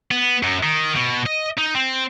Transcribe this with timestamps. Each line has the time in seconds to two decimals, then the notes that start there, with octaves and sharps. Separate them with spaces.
0.11 B3
0.43 F#2
0.63 D#3
0.96 B2
1.26 D#5
1.57 D#4
1.75 C4